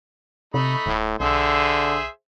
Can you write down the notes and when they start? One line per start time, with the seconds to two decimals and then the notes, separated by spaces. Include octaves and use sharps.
0.54 C3 A3 D#4 B5
0.86 D1 A2
1.20 B1 D3 G#4 C5 E5